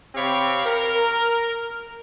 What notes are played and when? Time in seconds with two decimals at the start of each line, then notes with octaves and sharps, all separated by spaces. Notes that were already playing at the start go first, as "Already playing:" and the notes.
0.15 C3 C4 G4 C#5 F5 B5
0.66 A#4